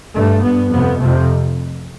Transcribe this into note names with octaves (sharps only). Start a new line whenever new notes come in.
G2 A3
G2 B3
F2 C3 B3
F2 C3 A3